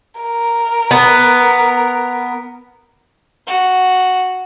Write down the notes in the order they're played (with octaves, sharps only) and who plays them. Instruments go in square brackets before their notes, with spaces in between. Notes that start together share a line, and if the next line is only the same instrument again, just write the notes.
[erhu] A#4
[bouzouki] B3
[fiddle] F#4